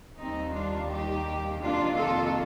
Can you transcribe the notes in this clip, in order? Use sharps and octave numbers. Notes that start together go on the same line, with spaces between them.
D#2 D#3 G3 A#3 C4 D#4
D4 F4
D#4 G4
F2 C3 D#3 A#3 D4 F4
F4 A4